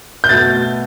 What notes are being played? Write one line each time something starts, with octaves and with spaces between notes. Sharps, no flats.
G6
B2 A3 A6